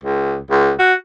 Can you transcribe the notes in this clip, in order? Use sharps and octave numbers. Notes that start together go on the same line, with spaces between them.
C#2
C#2
F#4